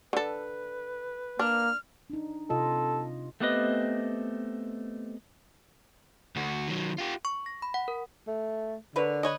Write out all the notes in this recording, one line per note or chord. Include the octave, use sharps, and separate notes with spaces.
D3 A4 B4
A#3 D4 F6
D4 D#4
C3 F4 A4 D#5
A3 B3 C4 G4 B4 D#5
D2 F#4
D#3 F#3
F4 G4
C#6
A#6
B5
F#5
A#4
A3
D3 A#4 B4 C#5
B4 C#5 D#5